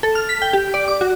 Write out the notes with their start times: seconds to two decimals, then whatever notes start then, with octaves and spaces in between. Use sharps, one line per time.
0.03 A4
0.15 F6
0.29 B6
0.42 G5
0.53 G4
0.74 D5
0.88 D6
1.01 F#4